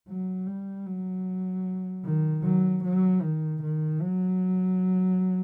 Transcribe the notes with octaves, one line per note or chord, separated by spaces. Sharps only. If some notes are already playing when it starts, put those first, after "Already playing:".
F#3
G3
F#3
D#3
F#3
F#3
D#3
D#3
F#3